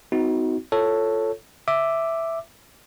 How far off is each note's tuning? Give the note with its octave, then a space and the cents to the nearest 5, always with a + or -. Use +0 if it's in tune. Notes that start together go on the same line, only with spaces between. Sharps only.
C4 -45 D#4 +35 F#4 +10
F4 +0 A4 +5 C#5 +0
E5 +0 D6 +5